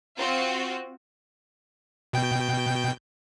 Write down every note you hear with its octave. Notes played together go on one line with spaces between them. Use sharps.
C4 F4 F#4
B2 G5 G6